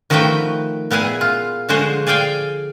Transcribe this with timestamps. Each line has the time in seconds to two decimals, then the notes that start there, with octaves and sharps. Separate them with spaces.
0.10 D#3 F3 A3 F#4 B4 G5
0.91 A#2 B3 E4 G#4 G#5
1.21 F4
1.69 D3 F3 G#3 F#4 G#4 C5
2.07 G#4 D5 F5 G5 G#5